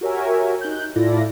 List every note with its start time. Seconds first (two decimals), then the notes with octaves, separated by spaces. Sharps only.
0.01 F#4 G4 A#4 C#5 E5 G#5
0.61 D#4 F#6 G6
0.96 A2 E4 F4 A4 D5 A#6